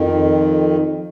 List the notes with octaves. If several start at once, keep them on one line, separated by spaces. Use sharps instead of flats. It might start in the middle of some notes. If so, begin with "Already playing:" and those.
Already playing: F2 D#3